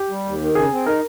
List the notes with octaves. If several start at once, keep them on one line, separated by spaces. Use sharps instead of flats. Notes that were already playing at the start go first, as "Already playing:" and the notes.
Already playing: G4
G3
D#2
D#3
C#3 G#4
C4
D#4 A#4